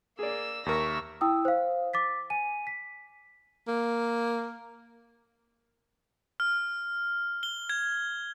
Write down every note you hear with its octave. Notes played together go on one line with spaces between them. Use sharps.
A#3 G#4 D5 E6
D#2 A#4 E5 C#6 E6 A#6
E4 G5 D#6 E6
C5 F5
D6 A6 B6
G#5 D#7
B6
A#3
F6
G7
G#6